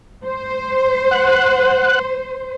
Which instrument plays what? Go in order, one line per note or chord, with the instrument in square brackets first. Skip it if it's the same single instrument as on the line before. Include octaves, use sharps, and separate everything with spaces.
[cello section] C5
[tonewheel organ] F#5 F#6